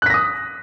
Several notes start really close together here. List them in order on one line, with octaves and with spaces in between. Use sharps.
F#6 B6 A#6 D#6